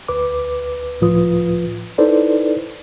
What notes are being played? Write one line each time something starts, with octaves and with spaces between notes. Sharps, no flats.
D2 B4 D6
C#2 A2 F3 F4 B4 D#6
D#4 E4 A4 B4 C5 D5